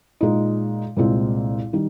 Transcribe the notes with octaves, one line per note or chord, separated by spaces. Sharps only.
A#2 G#3 D#4
C2 A#2 G#3 C4
D#3 G3